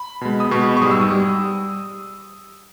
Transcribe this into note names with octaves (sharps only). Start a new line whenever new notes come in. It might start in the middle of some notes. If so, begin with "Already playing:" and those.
Already playing: B5
B2 G#3
D#6
B2 G#3 C#6
C#6
G#2 G3 D#6
E6
D#6
G3